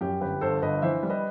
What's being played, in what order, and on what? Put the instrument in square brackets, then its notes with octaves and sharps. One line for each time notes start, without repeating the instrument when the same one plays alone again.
[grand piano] F#2 G4
G1 G4 B4
G1 A4 C5
G1 B4 D#5
E3 C5 E5
G3
B4 D#5